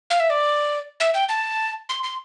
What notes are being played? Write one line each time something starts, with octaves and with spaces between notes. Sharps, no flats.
F5
E5
D5
E5
G5
A5
C6
C6